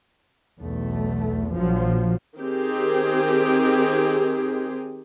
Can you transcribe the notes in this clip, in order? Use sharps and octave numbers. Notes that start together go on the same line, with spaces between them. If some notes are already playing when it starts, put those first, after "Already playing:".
B1 E2 A3
A#1 F3 F#3
D#3 C4 G4 G#4